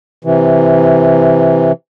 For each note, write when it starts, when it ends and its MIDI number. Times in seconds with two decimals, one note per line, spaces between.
0.24 1.72 48
0.24 1.72 52